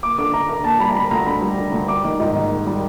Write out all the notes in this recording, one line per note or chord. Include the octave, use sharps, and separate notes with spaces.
D#2 D6
D3 D6
D3 A#5
D3 A#5
D#2 A5
G3 B5
A#5
D2 B5
D2 A#5
D3 B5
G3
D3
D2
G3 D6
D#3
G#2
D#3
D#3
G3